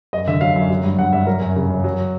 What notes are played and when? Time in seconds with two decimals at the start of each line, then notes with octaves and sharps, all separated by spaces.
0.13 F#2 D#5
0.27 D3 E5
0.41 F#3 F5
0.56 F#2
0.70 F#3
0.84 G2
0.99 G2 F#5
1.13 G2 E5
1.27 F#3 A#4
1.42 F#2
1.56 C#3
1.70 F#2
1.84 F#3